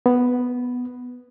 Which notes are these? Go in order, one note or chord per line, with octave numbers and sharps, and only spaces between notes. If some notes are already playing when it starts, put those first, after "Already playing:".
B3